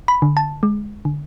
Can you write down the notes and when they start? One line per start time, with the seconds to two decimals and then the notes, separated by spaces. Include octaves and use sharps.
0.08 B5
0.22 D3
0.37 A5
0.63 G#3
1.05 D3